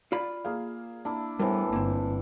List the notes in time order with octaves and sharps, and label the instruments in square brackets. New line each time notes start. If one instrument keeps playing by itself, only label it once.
[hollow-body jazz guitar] F4 D5 B5
[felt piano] A#3 G#4 F5
[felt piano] A#3 [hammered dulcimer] D4 E4
[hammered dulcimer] A2 E3 [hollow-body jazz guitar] G3 [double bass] B3 [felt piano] A#4 C5
[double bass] G1 [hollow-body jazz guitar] A#3 C4